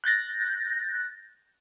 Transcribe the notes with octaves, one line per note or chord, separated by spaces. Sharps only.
F#6 G6 A6 A#6